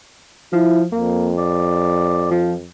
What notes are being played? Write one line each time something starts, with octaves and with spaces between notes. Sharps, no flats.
F3 E4
F2 A#3
D5
F3